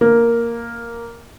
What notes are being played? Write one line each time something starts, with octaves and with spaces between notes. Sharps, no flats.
A#3